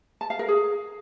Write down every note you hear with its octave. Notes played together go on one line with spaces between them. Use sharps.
A5
F5
A#4
G#4